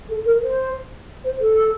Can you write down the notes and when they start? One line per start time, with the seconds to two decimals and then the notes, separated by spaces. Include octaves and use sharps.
0.09 A4
0.25 A#4
0.42 C5
1.24 C5
1.41 A4